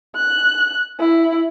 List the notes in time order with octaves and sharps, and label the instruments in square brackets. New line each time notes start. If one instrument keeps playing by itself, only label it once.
[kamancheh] F#6
E4